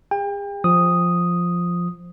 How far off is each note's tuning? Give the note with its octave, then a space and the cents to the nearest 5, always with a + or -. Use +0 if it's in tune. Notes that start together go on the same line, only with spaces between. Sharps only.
G#4 -45 G5 +35
F3 +0 D#6 +0